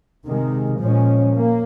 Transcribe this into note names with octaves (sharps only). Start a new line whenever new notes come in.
C3 D#3 G#3
A#2 F3 G#3 C#4
A#3